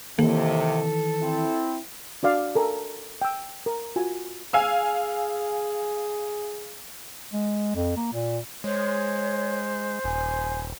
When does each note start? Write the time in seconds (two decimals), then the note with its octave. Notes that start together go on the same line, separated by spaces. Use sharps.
0.19 D#2 C3 D#3 E3 A#3 A4
1.22 C4 E4
2.23 D4 F#4 D5 F5
2.55 A4 A#4 G#5
3.22 G5 E6
3.66 A#4
3.96 F4 F#4 G#5
4.53 G#4 F5 G#5 E6
7.33 G#3
7.75 F2
7.97 A#3
8.13 A#2
8.64 G#3 C5 C#5
10.05 D#1 G#5